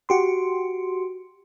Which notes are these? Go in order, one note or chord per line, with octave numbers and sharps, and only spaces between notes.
F#4 G4 C6